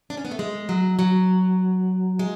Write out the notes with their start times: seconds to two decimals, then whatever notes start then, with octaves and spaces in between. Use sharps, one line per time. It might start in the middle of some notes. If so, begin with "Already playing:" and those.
0.10 D4
0.17 C#4
0.25 B3
0.31 A3
0.39 G#3
0.69 F#3
0.99 F#3
2.19 G#3